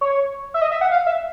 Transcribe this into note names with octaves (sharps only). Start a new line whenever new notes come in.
C#5
E5
D#5
E5
F#5
F5
E5